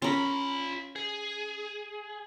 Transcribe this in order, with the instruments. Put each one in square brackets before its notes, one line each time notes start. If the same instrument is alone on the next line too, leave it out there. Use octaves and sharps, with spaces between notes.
[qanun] C#4 A#4 [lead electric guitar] F4 B5
[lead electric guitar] G#4